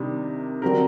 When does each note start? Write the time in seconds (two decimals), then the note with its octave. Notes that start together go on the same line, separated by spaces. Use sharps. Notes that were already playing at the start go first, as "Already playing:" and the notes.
Already playing: C3 D#3 G3 D4
0.62 D3 F#3 C4 G4 A#4